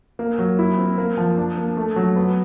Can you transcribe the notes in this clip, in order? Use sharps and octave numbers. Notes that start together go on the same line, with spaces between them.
A#3
F#3
E4
C4
A#3
F3
D4
A#3
A3
F#3
B3